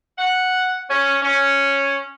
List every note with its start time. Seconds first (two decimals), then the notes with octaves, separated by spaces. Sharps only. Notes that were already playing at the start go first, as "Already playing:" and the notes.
0.18 F#5
0.90 C#4
1.22 C#4